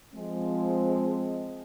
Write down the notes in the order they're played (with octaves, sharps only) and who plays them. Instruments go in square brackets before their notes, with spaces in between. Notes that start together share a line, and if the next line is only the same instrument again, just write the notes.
[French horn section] F3 G#3 C4